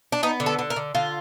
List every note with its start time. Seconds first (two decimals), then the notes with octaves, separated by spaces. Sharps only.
0.12 D4
0.23 B3 D#4
0.40 D3
0.46 A4
0.59 D3
0.70 A#4
0.76 D3
0.95 D3 F4